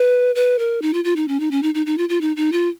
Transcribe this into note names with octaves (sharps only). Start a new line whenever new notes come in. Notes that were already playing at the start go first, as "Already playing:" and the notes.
Already playing: B4
B4
A#4
D#4
F4
F4
D#4
C#4
D#4
C#4
D#4
D#4
D#4
F4
F4
D#4
D#4
F4